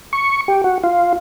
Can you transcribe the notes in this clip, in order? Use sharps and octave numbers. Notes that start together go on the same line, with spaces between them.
C#6
G4
F#4
F4